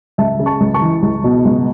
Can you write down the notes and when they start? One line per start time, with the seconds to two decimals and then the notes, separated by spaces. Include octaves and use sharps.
0.18 C#2 E5 A5
0.39 C#3
0.46 A5 C#6
0.60 C#2
0.74 A5 C#6
0.82 E3
1.02 C#2
1.24 B2
1.45 C#2